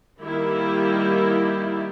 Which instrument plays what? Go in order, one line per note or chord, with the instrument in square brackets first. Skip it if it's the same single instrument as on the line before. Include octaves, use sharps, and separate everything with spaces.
[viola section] D#3 G3 A#3 E4 G4